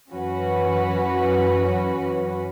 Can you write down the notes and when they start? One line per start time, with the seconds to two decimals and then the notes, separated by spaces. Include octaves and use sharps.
0.12 F#2 E3 C#4 F#4 B4